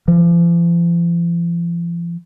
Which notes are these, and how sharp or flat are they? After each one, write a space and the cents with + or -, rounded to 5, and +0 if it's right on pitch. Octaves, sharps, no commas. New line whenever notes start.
F3 -40